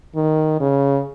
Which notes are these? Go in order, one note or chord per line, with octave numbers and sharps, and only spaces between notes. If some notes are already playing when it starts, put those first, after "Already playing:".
D#3
C#3